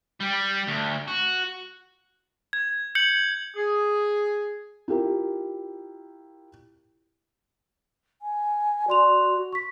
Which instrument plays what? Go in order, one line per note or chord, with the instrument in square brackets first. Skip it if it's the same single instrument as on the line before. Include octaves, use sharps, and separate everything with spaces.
[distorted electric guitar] G3
D2
F#4
[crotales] G#6
G6 C#7 F#7
[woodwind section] G#4
[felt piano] E4 F4 G4 A#4
[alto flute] G#5
[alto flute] F#4 [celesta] D5 C6 F7
[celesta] C#6 B6